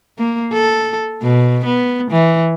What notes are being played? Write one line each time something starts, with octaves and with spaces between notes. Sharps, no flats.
A#3
A4
B2
B3
E3